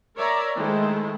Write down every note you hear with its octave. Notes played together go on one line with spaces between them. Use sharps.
A#4 C#5 D5 E5 A#5
D#3 G#3 A3 E4 C5